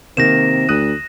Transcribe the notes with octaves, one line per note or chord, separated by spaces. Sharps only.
C3 D#3 A#3 A#6 E7
D2 D#6 F#6 D#7